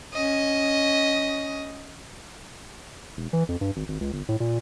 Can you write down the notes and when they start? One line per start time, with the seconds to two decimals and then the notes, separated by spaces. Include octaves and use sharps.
0.13 C#4 D#5
3.17 E1
3.33 E3
3.49 F2
3.61 G2
3.76 G#1
3.88 G#1
4.01 C#2
4.13 G1
4.28 A2
4.40 A#2